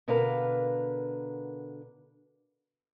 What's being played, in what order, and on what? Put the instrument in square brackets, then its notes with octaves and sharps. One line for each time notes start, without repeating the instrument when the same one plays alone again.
[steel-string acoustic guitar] B2 D3 A#4 B4 F5 A#5